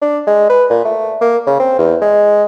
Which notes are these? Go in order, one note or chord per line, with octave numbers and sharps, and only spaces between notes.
D4
G#3
B4
A#2
A3
A#3
C#3
C4
E2
G#3